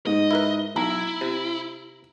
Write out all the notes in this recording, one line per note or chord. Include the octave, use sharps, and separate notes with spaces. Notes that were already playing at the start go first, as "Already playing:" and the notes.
G#2 D#5
E4 A#4 B4
B1 E4 A#5
C3